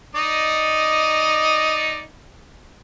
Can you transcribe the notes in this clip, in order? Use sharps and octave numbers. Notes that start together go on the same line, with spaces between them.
D#4 D5 D#5